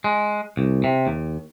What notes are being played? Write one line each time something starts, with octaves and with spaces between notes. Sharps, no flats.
G#3
C2
C3
D#2